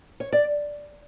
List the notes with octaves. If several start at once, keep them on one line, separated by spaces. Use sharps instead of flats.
C#5
D5